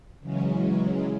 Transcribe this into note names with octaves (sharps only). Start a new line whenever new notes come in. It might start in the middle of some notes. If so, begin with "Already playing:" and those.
C#3 E3 F#3 G#3 C#4